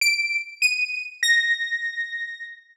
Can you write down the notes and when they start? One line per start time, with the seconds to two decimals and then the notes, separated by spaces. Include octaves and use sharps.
0.01 D7
0.62 D#7
1.23 A#6